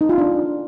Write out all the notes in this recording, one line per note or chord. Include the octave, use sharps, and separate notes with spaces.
D#4
F4
D4